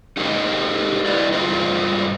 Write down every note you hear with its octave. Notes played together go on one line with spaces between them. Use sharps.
D#4 G4 G#4 A#4 C5 D#5
E4 B4 D5 D#5
G2 F4 G#4 C5 D#5